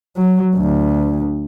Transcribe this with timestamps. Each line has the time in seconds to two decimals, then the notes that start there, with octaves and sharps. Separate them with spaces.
0.17 F#3
0.56 D2